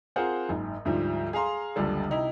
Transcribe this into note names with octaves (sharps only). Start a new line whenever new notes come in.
C4 F4 G#4 A#4 C5 F#5
F#1 G#2
D2 G#2 F3 G3
G#4 F5 A#5 C6
F#1 C#2 D3 G3 A4
C3 D#4 E4